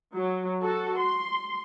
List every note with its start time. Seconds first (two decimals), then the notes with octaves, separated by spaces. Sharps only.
0.16 F#3
0.62 F#4 A4
0.98 C6